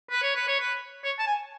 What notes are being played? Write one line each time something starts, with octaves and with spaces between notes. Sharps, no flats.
B4
C#5
B4
C#5
B4
C#5
A5
G#5